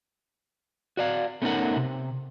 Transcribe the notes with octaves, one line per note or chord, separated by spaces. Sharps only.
F#4 D5 F5
A3 B3 C#4 D#4 A#4 F#5
C3